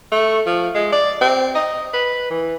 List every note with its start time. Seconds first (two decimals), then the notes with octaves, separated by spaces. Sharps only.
0.12 A3
0.47 F3
0.75 G#3
0.92 D5
1.21 C4
1.55 D#5
1.94 B4
2.30 E3